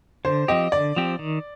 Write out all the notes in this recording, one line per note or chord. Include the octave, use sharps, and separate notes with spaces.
D3 C5
F3 C4 G4 D#5
D3 D5
F3 C4 G4
D#3